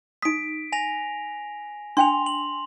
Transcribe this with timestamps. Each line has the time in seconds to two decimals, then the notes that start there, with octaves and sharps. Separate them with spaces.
0.22 D#4 D#6 B6 D7
0.72 G#5 A#6 F7
1.97 D4 G5 G#5 C6 F7
2.26 F#7